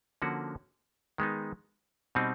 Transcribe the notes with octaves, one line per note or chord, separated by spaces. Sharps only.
D3 F3 A#3 C#4 F#4
D#3 G#3 B3 D#4
B2 G3 C4 D#4